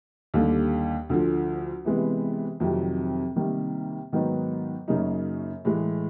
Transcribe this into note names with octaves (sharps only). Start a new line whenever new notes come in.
D#2 D3 G3
D2 D3 F3
C3 E3 G#3 B3
F2 C3 D#3 F#3
C3 D#3 G3 A#3
G#2 D#3 F#3 B3 D#4
F#2 C#3 F#3 A#3 D#4
A2 E3 G#3